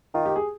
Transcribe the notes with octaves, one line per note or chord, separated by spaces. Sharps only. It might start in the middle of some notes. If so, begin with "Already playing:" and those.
D#3 F4
G4
G#4